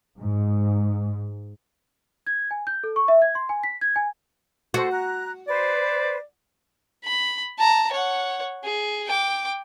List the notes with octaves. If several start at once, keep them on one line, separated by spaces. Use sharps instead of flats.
G#2
G#6
G#5
G6
A4
C#6
E5
G#6
C6
G#5
B6
G#6
G#5
F#4 A4 C5
A#5 F#6
B4 C5 D5
B5
A5 A#5
C#5 F#5
G#4
G5 D6